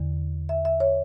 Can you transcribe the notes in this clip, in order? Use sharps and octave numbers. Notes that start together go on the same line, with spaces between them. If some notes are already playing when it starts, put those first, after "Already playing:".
Already playing: E2 D3
E5
E5
C#5